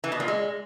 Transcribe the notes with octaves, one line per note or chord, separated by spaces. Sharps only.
E3
B2
A#2
G#3